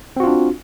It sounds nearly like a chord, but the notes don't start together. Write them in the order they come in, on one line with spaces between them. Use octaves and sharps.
C4 F#4 F4 D4